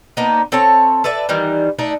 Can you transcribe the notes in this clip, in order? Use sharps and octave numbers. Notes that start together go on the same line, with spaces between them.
A#3 B3 D4 D#4
C4 A4 C#5 A5
A4 B4 D5 E5
D#3 E3 G3 D#4
A3 D4 D#4